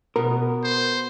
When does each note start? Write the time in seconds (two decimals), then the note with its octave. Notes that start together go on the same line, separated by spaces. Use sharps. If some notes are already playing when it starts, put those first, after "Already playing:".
0.16 B2 B3 A#4
0.64 C5